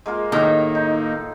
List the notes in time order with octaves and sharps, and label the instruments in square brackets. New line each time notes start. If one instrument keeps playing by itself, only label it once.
[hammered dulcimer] G#3 A#3 F4
[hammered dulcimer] A2 [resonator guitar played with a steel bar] D#3 [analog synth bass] A#3
[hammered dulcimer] D#4